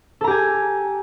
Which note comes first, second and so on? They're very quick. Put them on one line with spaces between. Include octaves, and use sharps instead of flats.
A4 A#5 G4 G#5